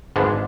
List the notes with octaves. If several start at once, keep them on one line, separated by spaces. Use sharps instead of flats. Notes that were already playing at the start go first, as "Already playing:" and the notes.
G#1 G#2 G#3 B3 D4